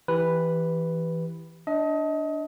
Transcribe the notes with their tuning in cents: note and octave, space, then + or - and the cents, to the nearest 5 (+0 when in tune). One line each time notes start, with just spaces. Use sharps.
E3 +0 G4 +0 B4 +0
D4 -5 D#5 +30